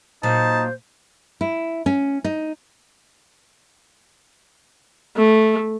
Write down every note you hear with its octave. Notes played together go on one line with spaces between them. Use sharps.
A#2 F#3 D#4 C5 A5
E4
C#4
D#4
A3